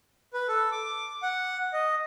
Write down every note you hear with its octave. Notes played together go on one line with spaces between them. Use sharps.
B4
A4
D6
F#5
D#5